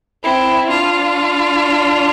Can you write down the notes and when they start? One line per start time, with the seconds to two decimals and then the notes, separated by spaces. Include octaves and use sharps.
0.23 C4 E4
0.70 D4 F4